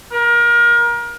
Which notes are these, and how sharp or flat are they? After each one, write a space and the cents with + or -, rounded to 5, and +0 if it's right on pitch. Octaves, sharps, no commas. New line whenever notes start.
A#4 +30